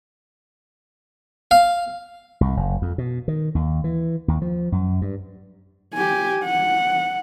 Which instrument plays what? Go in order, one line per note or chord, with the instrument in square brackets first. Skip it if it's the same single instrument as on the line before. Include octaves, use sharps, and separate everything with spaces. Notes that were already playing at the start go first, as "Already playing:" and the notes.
[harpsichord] F5
[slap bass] C2
F#1
F2
B2
D#3
D#2
E3
D#2
F3
F#2
G2
[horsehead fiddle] G4 G#5
F#5